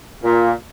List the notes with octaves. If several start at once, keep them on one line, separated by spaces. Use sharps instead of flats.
A#2